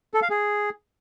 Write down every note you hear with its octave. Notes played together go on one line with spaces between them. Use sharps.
A4
F5
G#4